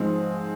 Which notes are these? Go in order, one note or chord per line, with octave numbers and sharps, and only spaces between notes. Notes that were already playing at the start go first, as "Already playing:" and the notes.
Already playing: G#2 F3 G#3 C4